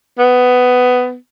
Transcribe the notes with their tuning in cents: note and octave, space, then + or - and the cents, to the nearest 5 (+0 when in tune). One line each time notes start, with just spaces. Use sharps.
B3 +15